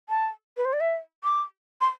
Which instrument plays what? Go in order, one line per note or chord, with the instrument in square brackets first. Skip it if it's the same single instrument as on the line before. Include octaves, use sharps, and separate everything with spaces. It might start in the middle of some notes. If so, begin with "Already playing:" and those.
[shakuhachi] A5
B4
C5
D5
E5
D6
C6